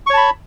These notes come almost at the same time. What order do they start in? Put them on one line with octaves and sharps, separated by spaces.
C#6 C#5 A5 B5